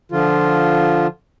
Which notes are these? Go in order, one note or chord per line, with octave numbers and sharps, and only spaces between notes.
D3 F3 F4